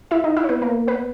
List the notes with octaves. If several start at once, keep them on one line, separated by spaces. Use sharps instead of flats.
E4 E5
D#4 D#5
E4 E5
C#5
B3 B4
A#3 A#4
B3 B4